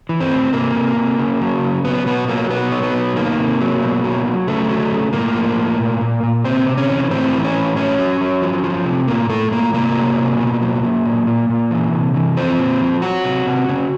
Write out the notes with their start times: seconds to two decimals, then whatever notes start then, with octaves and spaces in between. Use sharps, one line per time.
0.09 E3
0.21 C4
0.31 A2
0.53 C3 A#3
0.75 C3
0.97 C3
1.19 C#3
1.41 F#3
1.63 C#3
1.85 F#3 B3
2.06 B2 B3
2.28 F#3 A#3
2.50 B2 B3
2.72 F#3
2.83 B3
2.94 B2
3.16 D#3 A#3
3.38 C3
3.61 F#3
3.82 B2
4.04 F#3
4.26 F#3
4.48 C#3 A3
4.69 F#3
4.92 C#3
5.13 A2 A#3
5.35 F3
5.57 A2
5.79 A#2
6.01 A#2
6.23 A#2
6.44 C3 C4
6.67 C3
6.78 C#4
6.89 E3
7.11 A2 C4
7.33 E3
7.44 C#4
7.55 A2
7.76 F#3 C#4
7.99 F#3
8.21 F#3
8.42 F3
8.64 F3
8.85 C3
9.08 A2 A#3
9.30 A2 A3
9.51 A2 A#3
9.73 C3 A#3
9.95 F#3
10.18 C3
10.39 B2
10.62 F#3
10.83 F#3
11.06 A#2
11.27 A#2
11.49 A#2
11.71 E3
11.93 C3
12.14 E3
12.37 F3 C4
12.58 A#2
12.81 F3
13.02 F#3 F#4
13.24 C3
13.46 C3
13.69 C#3